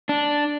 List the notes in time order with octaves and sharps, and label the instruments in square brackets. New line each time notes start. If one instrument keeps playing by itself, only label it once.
[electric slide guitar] D4